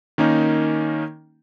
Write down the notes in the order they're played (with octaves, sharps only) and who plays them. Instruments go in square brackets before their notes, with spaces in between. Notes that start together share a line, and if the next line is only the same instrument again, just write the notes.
[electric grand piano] D#3 A#3 C#4 D#4